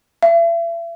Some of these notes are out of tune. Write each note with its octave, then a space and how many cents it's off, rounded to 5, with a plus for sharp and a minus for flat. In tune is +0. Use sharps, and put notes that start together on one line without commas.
E5 +40